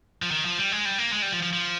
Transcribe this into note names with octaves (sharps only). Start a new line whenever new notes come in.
F3
D#3
F3
G3
G#3
G3
A#3
G#3
G3
F3
F3
F3